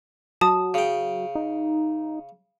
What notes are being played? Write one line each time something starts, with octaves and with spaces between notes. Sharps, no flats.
F#3 A5 D#6
C#3 G5
D#4